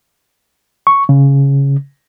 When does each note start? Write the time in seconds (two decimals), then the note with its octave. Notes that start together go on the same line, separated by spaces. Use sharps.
0.87 C#6
1.09 C#3